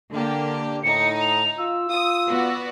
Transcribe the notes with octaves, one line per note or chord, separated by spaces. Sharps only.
D3 A#3 D4 G4
A2 D#4 C#7
F7
F4 E6
F4 D#6
B3 F#4 D5